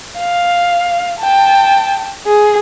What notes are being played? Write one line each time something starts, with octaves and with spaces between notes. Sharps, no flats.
F5
G5 A5
G#4